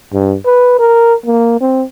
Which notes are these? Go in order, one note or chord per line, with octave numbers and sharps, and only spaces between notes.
G2
B4
A#4
A#3
C4